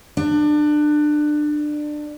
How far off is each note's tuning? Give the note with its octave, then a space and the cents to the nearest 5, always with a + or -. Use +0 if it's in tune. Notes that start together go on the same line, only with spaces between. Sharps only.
D4 +25